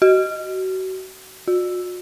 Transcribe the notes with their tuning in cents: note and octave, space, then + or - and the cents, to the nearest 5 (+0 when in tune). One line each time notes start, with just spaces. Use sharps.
F#4 +30
F#4 -40